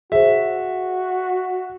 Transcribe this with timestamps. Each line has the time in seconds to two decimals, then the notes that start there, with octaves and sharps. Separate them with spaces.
0.12 F#4 G#4 C5 E5